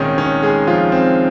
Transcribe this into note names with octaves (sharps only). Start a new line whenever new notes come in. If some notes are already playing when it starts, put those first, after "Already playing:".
Already playing: C2 A#2 D#3 G#3 C#4 D#4
C#4
G#3 G#4
F3 F4
C4